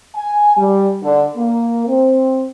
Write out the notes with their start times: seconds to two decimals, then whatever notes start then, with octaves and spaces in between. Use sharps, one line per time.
0.15 G#5
0.57 G3
1.03 D3
1.37 A#3
1.87 C4